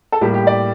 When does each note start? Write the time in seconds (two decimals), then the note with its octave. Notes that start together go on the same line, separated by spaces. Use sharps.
0.12 A4
0.21 A2 G3 A#3 G4
0.34 G4
0.47 D5